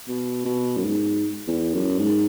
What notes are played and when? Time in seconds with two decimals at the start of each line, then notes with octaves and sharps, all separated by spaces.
0.08 B2
0.46 B2
0.78 F#2
0.84 G#2
1.48 E2
1.74 F#2
1.99 G#2